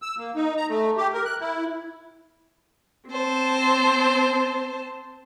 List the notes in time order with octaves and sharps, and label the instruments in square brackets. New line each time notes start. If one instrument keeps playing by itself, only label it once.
[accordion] E6
A#3
D#4
A#5
A3
G4
A#4
F#6
E4
[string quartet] C4 C5 A5